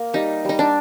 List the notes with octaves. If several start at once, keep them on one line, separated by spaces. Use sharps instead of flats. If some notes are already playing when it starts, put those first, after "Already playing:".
Already playing: A#3
G3 D#4
G3 D#4
D4